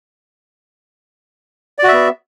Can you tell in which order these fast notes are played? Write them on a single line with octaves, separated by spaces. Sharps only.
D5 F#4 E5 B3